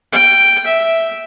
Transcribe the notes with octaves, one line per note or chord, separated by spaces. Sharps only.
G5
E5